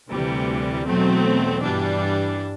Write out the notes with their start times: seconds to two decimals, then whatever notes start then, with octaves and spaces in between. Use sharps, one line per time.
0.11 D2 C3 E3 G3
0.87 E2 B2 F#3 A3 C4
1.62 G2 E3 G3 D4